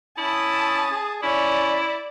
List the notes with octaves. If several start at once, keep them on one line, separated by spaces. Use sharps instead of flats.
C#4 E4 A5 D#6
G#4
C#4 E4 D5